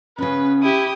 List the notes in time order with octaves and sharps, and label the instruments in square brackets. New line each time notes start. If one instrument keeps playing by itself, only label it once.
[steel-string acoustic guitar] C#3 B3 [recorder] C#4 [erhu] B4
[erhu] E4 [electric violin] G4 D#6